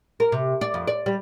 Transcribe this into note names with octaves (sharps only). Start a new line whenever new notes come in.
A#4
C3
D5
F2
D5
G3